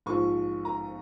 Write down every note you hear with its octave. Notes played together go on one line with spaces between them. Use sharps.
A#1 G#2 F3 C#6
A#5